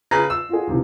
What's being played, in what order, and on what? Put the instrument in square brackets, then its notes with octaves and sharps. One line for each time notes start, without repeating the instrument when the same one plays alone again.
[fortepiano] C#3 B4 A#5
E6
[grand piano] F4 F#4 G#4
D#2 C3 E3